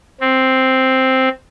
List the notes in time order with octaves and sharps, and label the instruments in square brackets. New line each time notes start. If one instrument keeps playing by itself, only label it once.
[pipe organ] C4